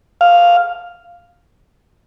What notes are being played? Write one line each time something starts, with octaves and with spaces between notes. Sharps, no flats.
F5